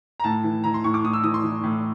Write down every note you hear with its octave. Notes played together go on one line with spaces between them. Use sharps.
A#5
A2 A5
E3
E3 A#5
C6
A2 C#6
D6
A2 D#6
E6
E3 D#6
C6
E3
A2